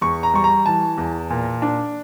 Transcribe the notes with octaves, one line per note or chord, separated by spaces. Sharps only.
E2 C#6
A#5
G3 C#6
A#5
E3 A5
E2
A#2
D4